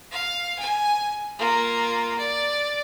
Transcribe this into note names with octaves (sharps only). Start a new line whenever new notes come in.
F5
G#5
A#3 F4
D5